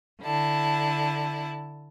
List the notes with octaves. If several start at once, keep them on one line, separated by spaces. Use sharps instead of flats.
D3 E4 A5